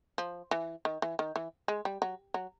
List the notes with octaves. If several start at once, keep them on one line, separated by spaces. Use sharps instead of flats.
F3
E3
D#3
E3
D#3
E3
G#3
G3
F#3
F#3